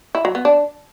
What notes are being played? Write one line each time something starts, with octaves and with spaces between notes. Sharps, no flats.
E4
F#3
B3
D4